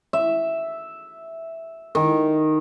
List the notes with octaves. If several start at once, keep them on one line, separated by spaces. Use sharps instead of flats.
E5
D#3